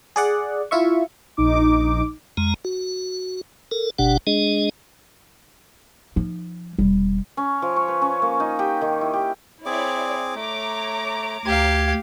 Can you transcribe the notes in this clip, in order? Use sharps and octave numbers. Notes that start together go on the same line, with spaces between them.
G#4 D5 F#5
E4 F4 E5 C#6
A#1 D#4 D6
F2 G#3 A#5
F#4
A4 A#4
G1 B2 D4 G4 F#5
G#3 D4 G#4 D#5
F3 D#4
E1 G3
C#4
F3
C#5
B4
C#4
A#3
D#4
G4
D#3
E4
G4
C4 E4 G#4 C#5 D5 D6
A3 C#5 A#5 D6
D2 G4 F5 G#6